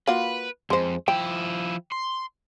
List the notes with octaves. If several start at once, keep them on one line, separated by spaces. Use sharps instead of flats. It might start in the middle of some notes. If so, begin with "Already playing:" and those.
A#3 F4 F#4 B4
F2 G#3 C5
F3 E4 G5
C6